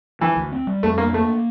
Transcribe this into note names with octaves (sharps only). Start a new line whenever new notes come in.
E3 F3
D2
C4
G3
F2 A3
A#3 D4
A3 A#3